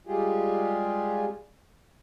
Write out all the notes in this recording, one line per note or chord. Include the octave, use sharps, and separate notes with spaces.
G3 G#3 F4 G4 G#4